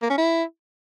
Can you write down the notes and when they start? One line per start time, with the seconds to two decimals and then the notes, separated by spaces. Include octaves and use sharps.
0.02 A#3
0.10 C#4
0.18 E4